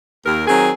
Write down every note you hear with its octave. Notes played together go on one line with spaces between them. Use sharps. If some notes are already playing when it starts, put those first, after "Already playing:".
D#2 A#4
D#3 F#3 C4 G#4